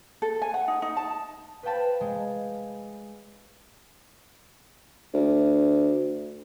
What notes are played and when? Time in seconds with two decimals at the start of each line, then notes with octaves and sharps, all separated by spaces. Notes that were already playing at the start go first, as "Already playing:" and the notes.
0.22 A4
0.42 G#5
0.54 F#5
0.68 D#4
0.82 D#4
0.97 A5
1.63 B4 C5 F5 G5 A5 B5
2.01 G#3
5.14 D2